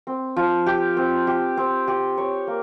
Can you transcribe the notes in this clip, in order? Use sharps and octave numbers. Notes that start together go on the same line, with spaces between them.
C4
F3
G4
C4
G4
C4
G4
C#5
A#3